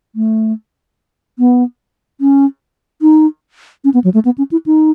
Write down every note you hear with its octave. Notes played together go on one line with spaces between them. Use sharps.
A3
B3
C#4
D#4
C#4
B3
F#3
A3
B3
C#4
E4
D#4